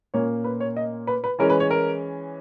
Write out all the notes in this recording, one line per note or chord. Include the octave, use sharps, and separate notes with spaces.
A#2 A#3 C#4 C#5
B4
C#5
D#5
B4
B4
E3 G#3 C#4 A#4
B4
C#5
A#4